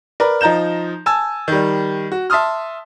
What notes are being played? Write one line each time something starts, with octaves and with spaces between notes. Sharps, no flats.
A#4 B4 D5
F3 D#4 A#5 G6 E7
G#5 A5 E6
D#3 G3
F#4
E5 A5 C6 D#6 F6